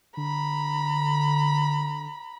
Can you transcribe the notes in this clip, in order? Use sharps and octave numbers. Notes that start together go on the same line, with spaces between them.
D3 A#5 B5